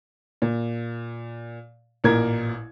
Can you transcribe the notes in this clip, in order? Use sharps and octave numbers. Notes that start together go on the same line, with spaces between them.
A#2
A1 A#2 A#4 G#6